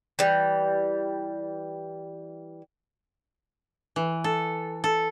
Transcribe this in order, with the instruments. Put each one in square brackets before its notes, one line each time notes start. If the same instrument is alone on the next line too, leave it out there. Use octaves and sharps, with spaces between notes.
[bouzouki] E3 G3
[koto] E3
A4
A4